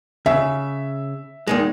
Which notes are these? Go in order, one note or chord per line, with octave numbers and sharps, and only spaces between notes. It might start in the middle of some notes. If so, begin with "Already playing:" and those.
C#3 E5
E2 D#3 G#3